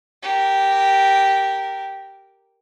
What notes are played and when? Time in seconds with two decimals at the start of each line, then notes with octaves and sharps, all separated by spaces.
0.23 G4 A#4